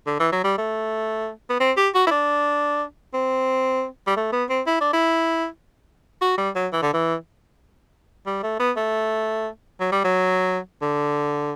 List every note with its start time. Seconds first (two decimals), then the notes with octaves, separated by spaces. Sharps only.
0.07 D3
0.20 E3
0.32 F#3
0.44 G3
0.58 A3
1.50 B3
1.60 C4
1.77 G4
1.95 F#4
2.07 E4
2.11 D4
3.14 C4
4.07 G3
4.17 A3
4.33 B3
4.50 C4
4.67 E4
4.81 D4
4.93 E4
6.21 F#4
6.38 G3
6.56 F#3
6.73 E3
6.82 D3
6.94 E3
8.27 G3
8.43 A3
8.60 B3
8.77 A3
9.80 F#3
9.92 G3
10.04 F#3
10.82 D3